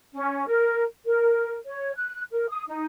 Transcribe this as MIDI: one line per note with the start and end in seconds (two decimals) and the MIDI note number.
0.13 0.46 61
0.47 0.83 70
1.05 1.54 70
1.65 1.91 73
1.95 2.22 90
2.31 2.46 70
2.47 2.62 87
2.67 2.85 63